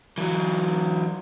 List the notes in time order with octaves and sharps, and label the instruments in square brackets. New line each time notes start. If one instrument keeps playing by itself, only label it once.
[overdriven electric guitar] E3 F#3